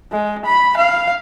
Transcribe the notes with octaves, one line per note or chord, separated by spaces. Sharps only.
G#3
B5
F5